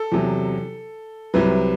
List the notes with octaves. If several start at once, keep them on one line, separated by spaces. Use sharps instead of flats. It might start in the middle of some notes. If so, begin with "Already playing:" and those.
Already playing: A4
E2 C3 F#3
C2 C3 F#3 B4